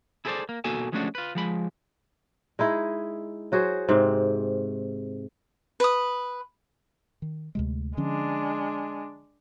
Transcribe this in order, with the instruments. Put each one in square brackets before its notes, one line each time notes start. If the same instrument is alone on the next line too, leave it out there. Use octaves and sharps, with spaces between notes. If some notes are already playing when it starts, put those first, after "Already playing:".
[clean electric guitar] E4 G#4 A4 B4 C5 D5
A#3
B2 A#3 F#4 A4 G#5 A5
F3 G#3 A3 C#4 D4 F#4
F4 B4
F3 G#3 B5
[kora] G#3 D#4 E4 G#4
F#3 F#4 G#4 C5
G#2 C3 C4
[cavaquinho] B4 D#6
[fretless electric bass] D#3
D2 C3 G#3
[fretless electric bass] D3 F3 C#4 [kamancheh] G#3 D4